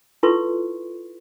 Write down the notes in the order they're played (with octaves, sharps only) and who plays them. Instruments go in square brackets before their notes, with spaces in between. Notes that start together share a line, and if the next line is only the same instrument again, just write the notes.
[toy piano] E4 F4 A4 B4 C6 C#6